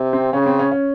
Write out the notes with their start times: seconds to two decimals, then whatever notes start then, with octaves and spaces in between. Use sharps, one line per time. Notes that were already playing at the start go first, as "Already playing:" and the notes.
Already playing: C3
0.13 C4
0.33 C#3 C#4
0.46 C4
0.59 C#4
0.71 C#4